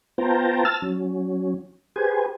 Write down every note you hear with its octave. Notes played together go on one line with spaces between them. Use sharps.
B3 F4 C5 G5 A5 A#5
A5 E6 F6 A6
F#3 C#4
G4 G#4 B4 C5 G#5